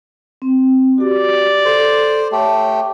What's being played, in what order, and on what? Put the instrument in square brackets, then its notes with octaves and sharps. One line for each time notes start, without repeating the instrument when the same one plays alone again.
[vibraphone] C4
[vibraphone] F#4 G4 [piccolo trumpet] D5
[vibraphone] A4 [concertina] C5
[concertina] A3 G4 [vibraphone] C#5